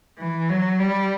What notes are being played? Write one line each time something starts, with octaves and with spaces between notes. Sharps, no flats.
E3
F#3
G3